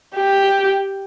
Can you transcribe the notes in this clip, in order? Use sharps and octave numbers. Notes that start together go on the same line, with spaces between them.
G4